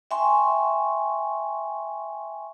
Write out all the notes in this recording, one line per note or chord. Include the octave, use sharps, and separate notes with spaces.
E5 G5 G#5 C6 C#6